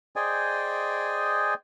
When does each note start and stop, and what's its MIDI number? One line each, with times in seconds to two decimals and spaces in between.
0.16 1.54 68
0.16 1.54 72
0.16 1.54 74
0.16 1.54 75
0.16 1.54 79
0.16 1.54 80